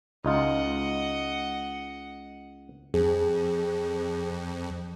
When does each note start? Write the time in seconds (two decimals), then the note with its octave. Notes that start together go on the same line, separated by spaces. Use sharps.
0.25 C#2 D#4 F4 D#5 F#5
2.94 F2 G#4